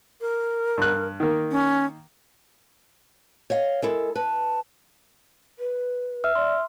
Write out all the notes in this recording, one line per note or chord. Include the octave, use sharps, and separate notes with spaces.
A#4
G2 F#6
D#3 A#3
C#4
C#5 D#5 F5
G#3 E4 A4 A#4
B4 A5
B4
E5 E6 F6
D5 C6